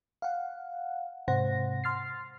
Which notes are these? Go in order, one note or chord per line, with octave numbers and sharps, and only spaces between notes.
F5 F#5
G#2 C3 C5 F#5 A#6
C6 F6 A6 C7